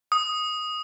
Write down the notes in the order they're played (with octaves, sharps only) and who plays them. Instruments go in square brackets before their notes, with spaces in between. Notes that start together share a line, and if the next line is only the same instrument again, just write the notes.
[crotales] D#6